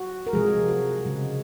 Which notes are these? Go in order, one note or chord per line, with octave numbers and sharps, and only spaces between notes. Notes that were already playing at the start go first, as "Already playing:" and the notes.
Already playing: F#4
A#4
C3 F3 G#3 G#4
F#4
C#3 G#3